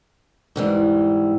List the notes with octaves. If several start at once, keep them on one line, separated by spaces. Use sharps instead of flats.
G#2 E3 G3